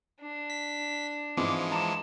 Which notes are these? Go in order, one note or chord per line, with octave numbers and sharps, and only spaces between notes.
D4
B6
F2 G#2 E3 F3 G#3 D6
A5 A#5 D6